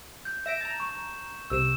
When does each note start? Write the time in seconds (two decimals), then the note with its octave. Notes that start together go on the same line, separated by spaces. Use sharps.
0.25 G6
0.46 E5 A#6 D7 E7
0.61 A5 A#5
0.80 C#6
1.50 C2 C3 E6 E7